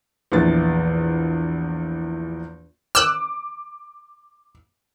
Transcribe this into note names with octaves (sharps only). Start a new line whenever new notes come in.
A#1 E2 E3 A6
D6 E6 F#6